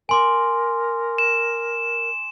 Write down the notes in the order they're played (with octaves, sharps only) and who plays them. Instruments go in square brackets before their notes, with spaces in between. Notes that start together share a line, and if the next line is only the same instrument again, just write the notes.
[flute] A#4 [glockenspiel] G#5 C6 D6
[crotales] E7